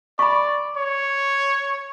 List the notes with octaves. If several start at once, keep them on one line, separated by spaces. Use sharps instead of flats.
D5 B5 C#6
C#5